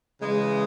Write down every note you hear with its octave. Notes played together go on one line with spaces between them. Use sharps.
C#3 E3 G#3